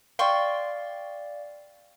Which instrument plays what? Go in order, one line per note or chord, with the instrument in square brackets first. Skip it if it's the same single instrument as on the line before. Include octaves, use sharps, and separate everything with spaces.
[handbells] D5 F5 [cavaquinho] G5 C6 C#6